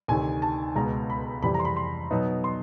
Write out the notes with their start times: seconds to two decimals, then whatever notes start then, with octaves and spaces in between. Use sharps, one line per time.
0.08 D2 C3 D#3 G#5
0.42 A5
0.75 C#2 B2 G#3 A#5
1.10 B5
1.43 F2 C3 E3 G3 B5
1.54 A#5
1.59 C6
1.65 B5
1.76 C6
2.11 B2 F#3 B3 D#4
2.44 C6